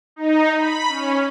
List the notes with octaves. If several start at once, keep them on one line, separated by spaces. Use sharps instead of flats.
D#4
B5
C#4